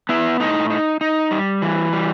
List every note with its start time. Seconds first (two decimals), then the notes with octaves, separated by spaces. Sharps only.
0.09 B3 E4
0.40 A2 D#4
0.70 D#4
1.01 D#4
1.31 G3
1.62 E3
1.93 G3